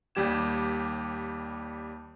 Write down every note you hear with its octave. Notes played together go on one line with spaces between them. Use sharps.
D#2 G3 G4 G#6 E7